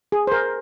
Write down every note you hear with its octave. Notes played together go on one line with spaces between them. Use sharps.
G#4
C5
A#4